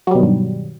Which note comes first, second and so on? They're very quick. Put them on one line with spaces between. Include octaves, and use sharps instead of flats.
F#3 G3 B2 D#3 G2